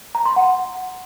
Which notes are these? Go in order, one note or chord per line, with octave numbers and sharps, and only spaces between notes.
A#5
C6
F#5